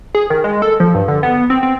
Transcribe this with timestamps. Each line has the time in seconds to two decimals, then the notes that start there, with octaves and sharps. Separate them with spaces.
0.15 G#4
0.30 D#3
0.44 G#3
0.62 A4
0.80 F3
0.95 G2
1.08 D3
1.23 B3
1.50 C4
1.63 C4